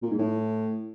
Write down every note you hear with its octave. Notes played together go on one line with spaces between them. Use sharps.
A#2
G#2
A2